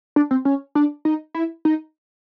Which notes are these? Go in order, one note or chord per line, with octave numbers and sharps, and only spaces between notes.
D4
C4
C#4
D4
D#4
E4
D#4